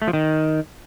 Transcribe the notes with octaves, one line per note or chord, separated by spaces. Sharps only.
A3
F3
D#3